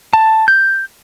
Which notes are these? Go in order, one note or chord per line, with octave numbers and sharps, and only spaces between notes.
A5
G6